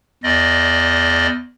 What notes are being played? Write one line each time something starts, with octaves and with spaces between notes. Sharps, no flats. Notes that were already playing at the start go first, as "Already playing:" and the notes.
E2 D5 D#5